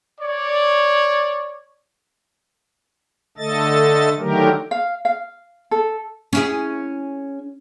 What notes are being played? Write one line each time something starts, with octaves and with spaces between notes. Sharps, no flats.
C#5 D5
D3 A3 A4 D#5 A6
D3 D#3 F#3 A3 G4 A#4
F5
F5
A4
C#4 E4 G#4